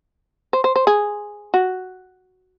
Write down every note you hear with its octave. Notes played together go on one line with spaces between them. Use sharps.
C5
C5
C5
G#4
F#4